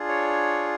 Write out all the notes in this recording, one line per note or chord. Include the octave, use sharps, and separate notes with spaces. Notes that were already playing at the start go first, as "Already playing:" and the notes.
Already playing: D4 F4 G#4
C#5